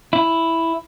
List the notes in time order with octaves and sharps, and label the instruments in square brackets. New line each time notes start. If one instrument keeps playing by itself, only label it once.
[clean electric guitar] E4